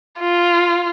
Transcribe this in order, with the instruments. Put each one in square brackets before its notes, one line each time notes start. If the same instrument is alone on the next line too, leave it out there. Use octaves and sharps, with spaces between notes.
[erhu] F4